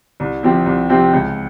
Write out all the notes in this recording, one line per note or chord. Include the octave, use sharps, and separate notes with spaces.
C2
C3 F3 C4 G4
C2
C3 F3 C4 G4
C#2